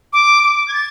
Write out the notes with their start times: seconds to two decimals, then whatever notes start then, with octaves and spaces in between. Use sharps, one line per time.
0.13 D6
0.43 D6
0.68 G#6
0.74 A6